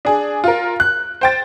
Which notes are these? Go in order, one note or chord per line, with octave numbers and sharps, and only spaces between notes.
D4 G#4
F4 A#4
F#6
C5 G5 A6